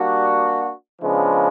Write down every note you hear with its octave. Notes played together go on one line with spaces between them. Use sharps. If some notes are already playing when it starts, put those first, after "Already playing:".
Already playing: G3 A#3 D4 F#4
C#3 F3 G#3 B3 D4